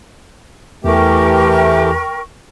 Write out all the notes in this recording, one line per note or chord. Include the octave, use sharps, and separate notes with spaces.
E2 E3 A3 G4 A#4 G5 C#6